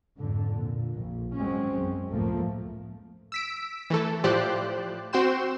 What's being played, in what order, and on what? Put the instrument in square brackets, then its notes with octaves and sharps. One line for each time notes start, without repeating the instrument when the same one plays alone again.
[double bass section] F2 G#2 D3
A#2
A#1
F#3 G#3 C4 C#4
F#2
C#2 A2 F3 A3 A#3
[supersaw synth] E6 B6 D7
E3 A3 A4
A2 F3 G4 C5 D5 F#6
C4 F#4 C5 G5 C6 E7